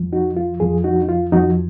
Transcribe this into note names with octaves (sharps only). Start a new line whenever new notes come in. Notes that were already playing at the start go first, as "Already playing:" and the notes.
Already playing: F2 F3
D#4 F#4
F4
F2 F3 F4 G#4
D#4 F#4
D#4
F4
F2 F3 D#4 F#4